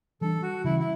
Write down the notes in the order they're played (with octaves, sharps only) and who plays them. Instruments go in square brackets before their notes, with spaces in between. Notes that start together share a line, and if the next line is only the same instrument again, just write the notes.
[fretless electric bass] E3 G3 D4 [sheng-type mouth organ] A4
[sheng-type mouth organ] F#4
[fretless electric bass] C#3 E3 G3 C#4 [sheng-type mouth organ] E4
[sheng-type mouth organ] E4